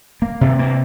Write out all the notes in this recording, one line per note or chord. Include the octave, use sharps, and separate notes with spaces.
A#3
C3
A#3